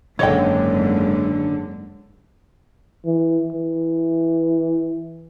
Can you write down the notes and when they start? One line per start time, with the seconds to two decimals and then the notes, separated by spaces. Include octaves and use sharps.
0.19 F#1 G#2 D3 G#3 C#5 D#5 G5
3.05 E3
3.53 E3